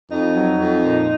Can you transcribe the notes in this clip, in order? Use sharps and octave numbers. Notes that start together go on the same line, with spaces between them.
F2 D#4
F#3
F2
A#2